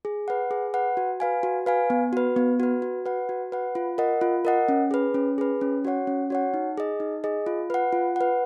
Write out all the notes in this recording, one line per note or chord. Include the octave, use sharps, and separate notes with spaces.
G#4
B4 F#5
G#4
B4 F#5
F#4
B4 F5 G#5
F#4
B4 F5 G#5
B3
F#4 B4
B3
F#4 B4
F#4
B4 F#5
F#4
B4 F#5
F4
A#4 D#5 F#5
F4
A#4 D#5 F#5
C#4
G#4 B4
C#4
G#4 B4
C#4
F#4 C#5 F#5
C#4
F#4 C#5 F#5
D#4
G#4 D#5
D#4
G#4 D#5
F4
B4 F#5
F4
B4 F#5